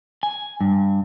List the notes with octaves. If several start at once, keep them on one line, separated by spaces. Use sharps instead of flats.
G#5
G2